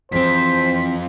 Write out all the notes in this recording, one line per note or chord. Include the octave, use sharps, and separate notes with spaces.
F2 E3 G#3 C4 C5 B6